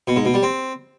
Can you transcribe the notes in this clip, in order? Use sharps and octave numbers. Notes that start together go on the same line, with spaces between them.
B2
G#2
B2
G3
C4